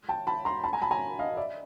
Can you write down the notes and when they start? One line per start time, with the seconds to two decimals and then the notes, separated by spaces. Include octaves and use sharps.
0.09 G5 A5
0.27 A5 B5
0.45 A#5 C6
0.64 A5 B5
0.73 G#5 A#5
0.82 A5 B5
0.91 G#5 A#5
1.19 D#5 F5
1.37 D5 E5